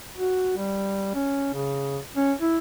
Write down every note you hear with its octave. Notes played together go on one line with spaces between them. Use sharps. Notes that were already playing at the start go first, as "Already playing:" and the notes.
F#4
G3
C#4
C#3
C#4
E4